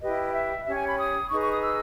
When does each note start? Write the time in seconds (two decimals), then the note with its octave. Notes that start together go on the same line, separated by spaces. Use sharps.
0.01 E4 G4 B4 D#5
0.33 E5
0.65 C#4 G4 C#5 E5
0.76 G#5
0.87 B5
0.98 D#6
1.31 D#4 G#4 B4 C#6
1.42 C#6
1.52 D#6
1.63 E6